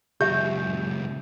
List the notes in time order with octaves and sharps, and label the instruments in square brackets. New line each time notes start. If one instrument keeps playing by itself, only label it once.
[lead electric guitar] C#2 F#2 [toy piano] G4 E5 [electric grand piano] G6